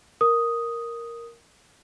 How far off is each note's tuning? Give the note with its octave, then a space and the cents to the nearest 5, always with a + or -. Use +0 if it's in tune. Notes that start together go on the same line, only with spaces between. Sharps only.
A#4 +0 D#6 +0